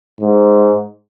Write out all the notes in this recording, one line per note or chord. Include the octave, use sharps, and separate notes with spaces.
G#2